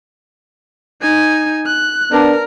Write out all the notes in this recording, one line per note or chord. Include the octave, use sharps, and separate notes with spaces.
D#4 G#5
F#6
B3 D4 A#4